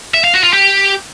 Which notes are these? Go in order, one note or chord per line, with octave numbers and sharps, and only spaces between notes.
E5
F5
F#4
F4
G4